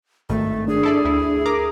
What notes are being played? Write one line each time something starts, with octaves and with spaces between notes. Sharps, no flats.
G#1 G2 D#3 A3
D4 G#4
E4 A4 D5
D2 E4
A#4 A#5 D6